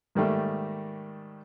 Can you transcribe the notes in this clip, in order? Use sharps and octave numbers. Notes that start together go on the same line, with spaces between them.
G#2 D#3 G3 A3 A#3